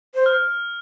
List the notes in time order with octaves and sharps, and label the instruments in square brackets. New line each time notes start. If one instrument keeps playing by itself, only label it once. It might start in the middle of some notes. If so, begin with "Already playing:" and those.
[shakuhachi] C5
[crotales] F6